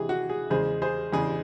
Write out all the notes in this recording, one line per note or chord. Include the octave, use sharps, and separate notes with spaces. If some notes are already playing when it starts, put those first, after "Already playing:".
Already playing: C3 E3 G#3 G#4
F#4
G#4
E2 C#3 G#3 G#4 C5
G#4 C5
E2 C#3 G#3 G#4